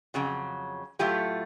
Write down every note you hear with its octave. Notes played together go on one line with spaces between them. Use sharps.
F2 C#3 F#3
A2 F#3 A3 F4 G4